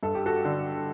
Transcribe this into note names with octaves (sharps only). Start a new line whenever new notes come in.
G2 A4
G4
F#4 A4
D3